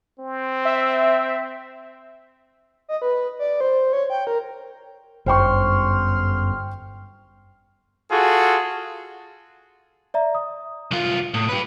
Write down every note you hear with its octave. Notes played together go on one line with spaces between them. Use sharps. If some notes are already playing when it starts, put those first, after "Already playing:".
C4
E5
D#5
B4
D5
C5
C#5
G5
A#4
G1 F#2 C5 G5 C6 C#6 F6
F4 F#4 G#4 A4
D5 E5 A#5
D#6
C2 F4
A2
G4 B4